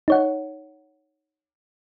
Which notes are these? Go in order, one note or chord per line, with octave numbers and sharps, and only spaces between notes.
D#4 C#5 F#5